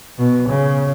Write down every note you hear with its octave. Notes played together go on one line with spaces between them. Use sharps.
B2
C#3